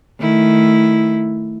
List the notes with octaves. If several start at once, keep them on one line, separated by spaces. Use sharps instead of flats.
D#3 A3 E4